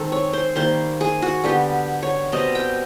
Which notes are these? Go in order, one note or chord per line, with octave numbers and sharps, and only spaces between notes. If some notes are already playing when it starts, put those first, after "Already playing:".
Already playing: D#3 G#3 C4 A4
C#5
C5
D#3 G3 A#3 C5
G#4
F#4
D3 G3 B3 G4
C#5
B2 G3 C4 D#5
G5